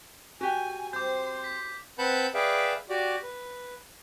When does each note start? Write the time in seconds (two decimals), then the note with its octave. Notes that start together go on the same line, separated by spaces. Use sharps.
0.41 F#4 G4 A#4 G#5
0.93 C4 C6 D6 G6
1.44 B6
1.99 C4 B4 F#5 A5 B5 G6
2.34 G#4 B4 D5 E5 F5 G5
2.89 F#4 G4 D5
3.23 B4